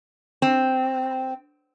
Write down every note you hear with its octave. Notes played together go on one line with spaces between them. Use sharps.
C4